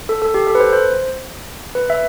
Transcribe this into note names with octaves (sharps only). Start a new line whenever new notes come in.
A4
A4
G4
A4
B4
C5
C5
B4
E5